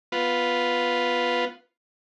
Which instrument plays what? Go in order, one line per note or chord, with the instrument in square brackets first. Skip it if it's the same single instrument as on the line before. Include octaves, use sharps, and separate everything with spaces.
[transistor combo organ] B3 F4